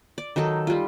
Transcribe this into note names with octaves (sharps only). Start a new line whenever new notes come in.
D5
D#3 F#3 D#4 A4
G3 F4